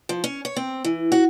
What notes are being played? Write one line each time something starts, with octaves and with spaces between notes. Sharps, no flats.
F3
C#4
C#5
C4
E3
F#4